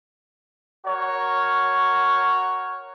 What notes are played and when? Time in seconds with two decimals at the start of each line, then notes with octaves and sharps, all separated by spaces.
0.86 F#4 A#4 C#5